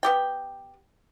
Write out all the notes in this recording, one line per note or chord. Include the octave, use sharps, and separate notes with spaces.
B3 G4 G5